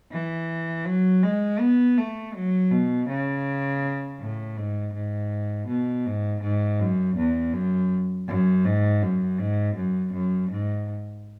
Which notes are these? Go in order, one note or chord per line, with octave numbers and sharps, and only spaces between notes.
E3
F#3
G#3
B3
A3
F#3
B2
C#3
A2
G#2
G#2
B2
G#2
G#2
F#2
E2
F#2
F#2
G#2
F#2
G#2
F#2
F#2
G#2